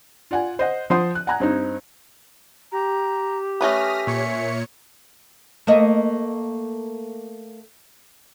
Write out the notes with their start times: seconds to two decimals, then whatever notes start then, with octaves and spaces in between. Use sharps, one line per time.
0.31 F4 D5 F#5 G#5
0.59 C5 D#5 F#5
0.90 F3 C5 F#5 C6 D#6
1.15 F#6
1.27 F#5 G#5 A#5 F#6 G#6
1.40 G2 C4 D#4
2.72 G4 A#5
3.61 A3 C#4 B4 E5 D#6 F6 A#6
4.07 A#2 C#5 C#7
5.67 A3 A#3 D#5